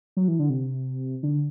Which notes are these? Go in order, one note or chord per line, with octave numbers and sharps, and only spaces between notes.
F#3
E3
D3
C3
D3